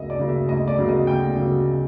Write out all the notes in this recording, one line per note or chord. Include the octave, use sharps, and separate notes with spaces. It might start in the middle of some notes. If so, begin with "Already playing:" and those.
Already playing: D2 C#3 F#3 A#3 D#5 E5
D5
C#3 F#3 A#3
E5
D2 D#5
D5
C#3 F#3 A#3
D#5
D2 G5
C#3 F#3 A#3